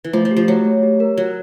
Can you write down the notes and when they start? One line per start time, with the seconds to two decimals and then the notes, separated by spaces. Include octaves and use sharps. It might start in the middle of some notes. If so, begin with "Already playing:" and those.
0.04 E3
0.13 F3 A3
0.25 F3
0.31 G4
0.37 F3
0.48 F#3 A3
0.65 A3
0.83 G4
1.00 A#4
1.18 F#3 A#4